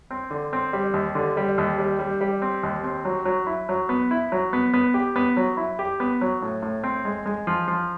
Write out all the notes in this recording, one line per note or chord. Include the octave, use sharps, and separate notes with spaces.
C4
D3
C4
G3
D#2
D3
G3
D#2
G3
G3
G3
C4
D#2
C4
F#3
F#3
E4
F#3
B3
E4
F#3
B3
B3
G4
B3
F#3
E4
G4
B3
F#3
A2
A2
C4
G#3
G#3
F3
F3